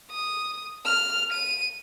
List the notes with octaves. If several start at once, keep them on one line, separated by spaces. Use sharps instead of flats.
D#6
F6
D#7